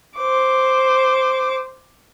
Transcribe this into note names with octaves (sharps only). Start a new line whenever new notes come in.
C5 D6